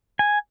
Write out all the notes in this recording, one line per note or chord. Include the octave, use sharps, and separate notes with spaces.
G#5